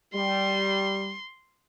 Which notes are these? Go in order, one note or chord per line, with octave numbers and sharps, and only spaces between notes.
G3 C6